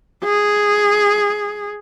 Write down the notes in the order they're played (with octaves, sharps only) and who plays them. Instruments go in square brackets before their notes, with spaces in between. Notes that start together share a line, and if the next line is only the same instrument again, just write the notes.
[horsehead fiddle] G#4